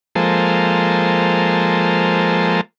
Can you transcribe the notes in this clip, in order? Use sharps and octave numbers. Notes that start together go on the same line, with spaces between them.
F3 G#3 A#3 A4 C5